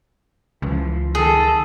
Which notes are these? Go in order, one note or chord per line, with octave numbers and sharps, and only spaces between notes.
C#2 E3 F3
D#3 G#4 A4